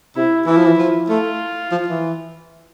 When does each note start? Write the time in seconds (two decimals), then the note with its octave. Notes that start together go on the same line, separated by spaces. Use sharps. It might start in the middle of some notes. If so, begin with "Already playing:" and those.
0.16 C3 E4
0.47 E3 E4
0.57 F3
0.66 E3
0.78 F3
1.09 A3 F4
1.71 F3
1.88 E3